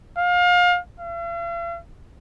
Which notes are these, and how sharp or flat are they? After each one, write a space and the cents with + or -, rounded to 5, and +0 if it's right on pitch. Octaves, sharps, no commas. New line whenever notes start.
F5 +30
F5 -45